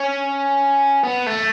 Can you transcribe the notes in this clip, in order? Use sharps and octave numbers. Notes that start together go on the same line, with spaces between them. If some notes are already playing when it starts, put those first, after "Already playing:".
Already playing: C#4
B3
A3